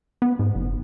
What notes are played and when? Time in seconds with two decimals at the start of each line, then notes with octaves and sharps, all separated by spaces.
0.22 B3
0.39 G#2
0.55 F#1